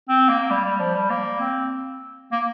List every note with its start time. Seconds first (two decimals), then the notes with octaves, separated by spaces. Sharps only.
0.09 C4
0.29 A#3
0.50 G3
0.65 G3
0.80 F3
0.95 G3
1.10 A#3
1.40 C4
2.32 A#3